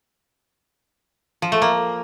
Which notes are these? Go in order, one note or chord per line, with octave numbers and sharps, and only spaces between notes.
F3
A3
A#3